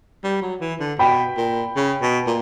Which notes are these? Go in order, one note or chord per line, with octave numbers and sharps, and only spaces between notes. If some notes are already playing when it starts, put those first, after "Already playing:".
G3
F#3
E3
D3
B2 G5 B5
A#2
C#3
B2
A#2